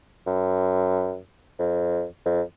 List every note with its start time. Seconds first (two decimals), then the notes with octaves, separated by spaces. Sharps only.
0.27 F#2
1.59 F2
2.26 F2